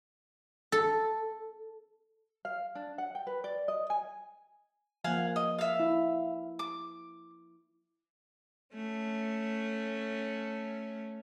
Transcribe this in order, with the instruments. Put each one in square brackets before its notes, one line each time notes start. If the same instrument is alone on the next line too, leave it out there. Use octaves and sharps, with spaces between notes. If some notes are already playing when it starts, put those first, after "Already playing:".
[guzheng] A4
[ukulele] F5
D4
F#5
G5
B4
D5
D#5
G#5
[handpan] F3 A#3 [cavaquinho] F5 F#5 G#5
[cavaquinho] D#5
E5 F5
[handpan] E4
[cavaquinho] D6
[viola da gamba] A3 C#4